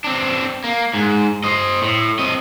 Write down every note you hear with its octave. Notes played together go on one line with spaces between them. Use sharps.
C4 D4
A#3
G#2
C5 D#5
A2
C4 D#5